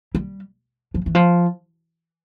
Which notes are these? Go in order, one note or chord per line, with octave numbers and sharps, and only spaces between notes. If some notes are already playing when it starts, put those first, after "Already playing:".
G3
F3
E3
F3